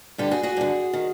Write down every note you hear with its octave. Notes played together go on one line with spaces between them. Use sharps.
G2 D3 G4 A4
F#4 G#4
F#4 G#4
G2 D3
D#3